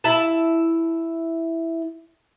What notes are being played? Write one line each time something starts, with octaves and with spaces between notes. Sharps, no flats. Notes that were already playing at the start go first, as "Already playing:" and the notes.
E4 A5